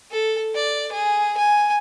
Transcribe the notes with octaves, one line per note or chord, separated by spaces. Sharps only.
A4
D5
G#4
G#5